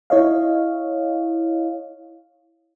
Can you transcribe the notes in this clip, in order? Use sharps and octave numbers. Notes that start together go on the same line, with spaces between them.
E4 C#5 D#5 F5